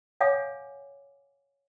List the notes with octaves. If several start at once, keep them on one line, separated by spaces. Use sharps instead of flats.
C#5 F5 F#5 G#5 D6